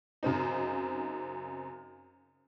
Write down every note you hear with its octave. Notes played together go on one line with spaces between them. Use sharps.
F#2 C#3 C4 D#4